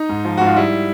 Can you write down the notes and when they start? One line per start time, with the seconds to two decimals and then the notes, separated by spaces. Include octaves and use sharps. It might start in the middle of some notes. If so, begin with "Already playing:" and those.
Already playing: D#4
0.09 G#2
0.25 F3
0.37 G#2 F#4
0.47 F4
0.56 G3 E4